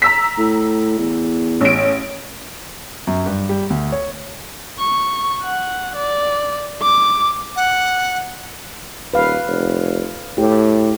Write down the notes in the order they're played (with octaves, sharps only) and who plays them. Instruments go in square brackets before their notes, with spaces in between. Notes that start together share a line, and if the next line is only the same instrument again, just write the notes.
[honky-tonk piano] A#5 E6 B6
[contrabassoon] A2
E2
[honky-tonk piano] A1 D7
[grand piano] F#2
G2
G3
D2
C#5
[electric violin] C#6
F#5
D5
D6
[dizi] F#5
[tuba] D#1 [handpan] B4 F5
[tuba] F1
[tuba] A2 [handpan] G4